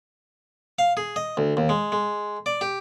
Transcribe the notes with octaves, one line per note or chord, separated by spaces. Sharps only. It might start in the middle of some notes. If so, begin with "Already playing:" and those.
F5
G#4
D#5
D2
D#2
G#3
G#3
D5
G4